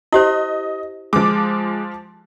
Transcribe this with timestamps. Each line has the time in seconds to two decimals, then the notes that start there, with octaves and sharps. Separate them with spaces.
0.12 E4 G4 C5 D#5
1.13 F3 G#3 D6